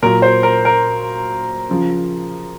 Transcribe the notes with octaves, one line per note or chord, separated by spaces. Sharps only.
A#2 F#3 A#4
C5
A#4
A#4
C#3 F3